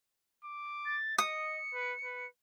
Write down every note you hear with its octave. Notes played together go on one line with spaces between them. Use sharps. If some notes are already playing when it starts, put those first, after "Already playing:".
D6
A6
D#5 D#6 C#7
B4
B4